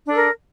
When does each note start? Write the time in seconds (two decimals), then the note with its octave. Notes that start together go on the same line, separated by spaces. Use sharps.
0.06 D4
0.10 A4
0.14 A#4